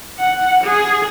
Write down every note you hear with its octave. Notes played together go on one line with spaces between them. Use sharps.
F#5
G#4